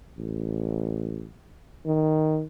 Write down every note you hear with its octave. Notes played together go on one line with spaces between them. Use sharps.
A1
D#3